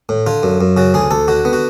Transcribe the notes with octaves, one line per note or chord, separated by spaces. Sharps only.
A2
D3 F4
F#2
F#2
C#3 F#4
D2 G#4
D2 A4
D3 F#4
B3
F#4